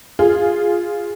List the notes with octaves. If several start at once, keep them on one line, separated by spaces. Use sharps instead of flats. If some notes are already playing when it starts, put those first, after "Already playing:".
F4 G#4